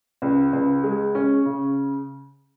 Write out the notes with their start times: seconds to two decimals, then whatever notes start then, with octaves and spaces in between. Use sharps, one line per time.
0.22 C#2
0.53 C#2
0.84 G#3
1.15 C#4
1.46 C#3